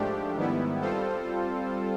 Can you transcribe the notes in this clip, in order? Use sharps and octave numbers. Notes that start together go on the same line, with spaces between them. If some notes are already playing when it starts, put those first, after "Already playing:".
Already playing: G#2 F3 A3 D4 G4
G#2 D#3 G3 B3 E4
G3 C4 F4 A4 C5